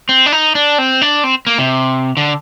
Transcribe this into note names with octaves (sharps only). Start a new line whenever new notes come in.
C4
D4
D#4
D4
C4
D4
C4
A#3
C3
D3